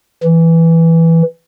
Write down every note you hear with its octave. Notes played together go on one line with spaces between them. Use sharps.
E3